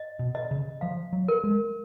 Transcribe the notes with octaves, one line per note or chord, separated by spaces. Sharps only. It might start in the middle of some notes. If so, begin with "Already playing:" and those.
Already playing: D#5
B2
D#5
C#3
F3 F5
F#3
A#4
G#3